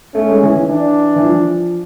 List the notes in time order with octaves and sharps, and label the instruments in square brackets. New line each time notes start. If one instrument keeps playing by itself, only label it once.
[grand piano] A3 [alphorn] C#4
[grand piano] G#3
E3
E3
[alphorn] D4
[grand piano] E3
F3